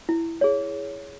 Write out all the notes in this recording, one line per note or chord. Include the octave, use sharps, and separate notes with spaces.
E4
G#4 C#5